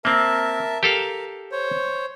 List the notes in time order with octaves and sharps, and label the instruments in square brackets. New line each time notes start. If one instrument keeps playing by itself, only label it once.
[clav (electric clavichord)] A#3 C4 [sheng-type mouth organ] A#4 E5 A5
[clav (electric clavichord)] G4 A4 F5 [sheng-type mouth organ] A#4
[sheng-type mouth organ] C5 C#5